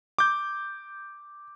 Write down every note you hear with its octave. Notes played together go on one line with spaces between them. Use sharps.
D6 G6